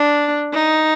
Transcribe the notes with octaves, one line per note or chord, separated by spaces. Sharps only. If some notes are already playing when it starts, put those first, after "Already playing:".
Already playing: D4
D#4